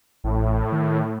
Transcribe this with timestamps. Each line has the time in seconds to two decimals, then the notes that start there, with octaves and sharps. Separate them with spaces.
0.24 A1 A2
0.72 D#3